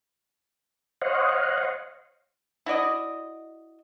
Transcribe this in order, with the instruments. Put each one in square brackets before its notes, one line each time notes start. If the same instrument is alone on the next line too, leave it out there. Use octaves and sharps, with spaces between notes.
[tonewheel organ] C5 C#5 D#5 F5 F#5
[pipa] E4 F#4 D5 D#5